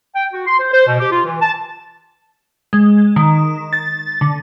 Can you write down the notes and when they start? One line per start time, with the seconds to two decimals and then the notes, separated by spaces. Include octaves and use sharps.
0.15 G5
0.33 F#4
0.47 C6
0.59 C5
0.73 C5
0.87 B2
0.99 G4
1.12 F4
1.25 E3
1.41 A5
2.73 G#3
3.16 D#3
3.73 A6
4.21 D3